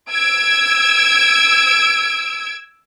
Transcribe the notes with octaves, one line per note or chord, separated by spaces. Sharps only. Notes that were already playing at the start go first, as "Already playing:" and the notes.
E6 G#6 D7